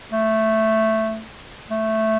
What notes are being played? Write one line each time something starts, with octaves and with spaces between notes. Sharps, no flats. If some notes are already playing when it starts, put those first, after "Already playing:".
A3
A3